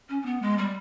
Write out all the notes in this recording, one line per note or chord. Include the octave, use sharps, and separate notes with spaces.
C#4
C#4
B3
G#3
G3